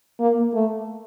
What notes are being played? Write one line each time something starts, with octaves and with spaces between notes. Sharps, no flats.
A#3
A3